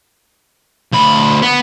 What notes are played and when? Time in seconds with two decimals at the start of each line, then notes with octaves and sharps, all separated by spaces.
0.92 D2 B5
1.42 B3